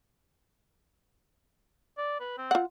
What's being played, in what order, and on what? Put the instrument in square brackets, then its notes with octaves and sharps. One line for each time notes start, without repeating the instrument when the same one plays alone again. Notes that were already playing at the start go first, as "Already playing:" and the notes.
[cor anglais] D5
B4
C4
[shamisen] F4 F#5